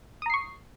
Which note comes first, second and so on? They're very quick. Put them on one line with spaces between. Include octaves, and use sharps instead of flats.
D#6 A#5 C7 C#6